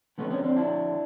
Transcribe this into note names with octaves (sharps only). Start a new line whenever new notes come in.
F2 D3 A3 B3
B3 C#4
C4 D4
D4 E4